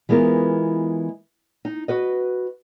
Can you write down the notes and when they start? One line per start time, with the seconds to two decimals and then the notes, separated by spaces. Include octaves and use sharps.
0.09 E3 G#3 B3 F4 A#4
1.65 D#4
1.88 F#4 B4 D#5